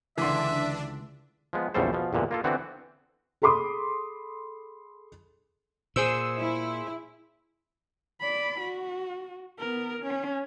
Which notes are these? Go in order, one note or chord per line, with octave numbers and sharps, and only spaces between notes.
C#2 D3 E3 D4 E5 C6
F3 G#3 B3
A#1 E2 C#3 G3 A4 C5
B2 F3
E2 G2 A#2 D3
A#3 F4 A4
D3 E3 B3 C4 F#4
G#4 A4 B5 C6 D6 D#6
A#2 G#4 C5 E6
E4
D5 B5
F#4
B3 A#4
C#4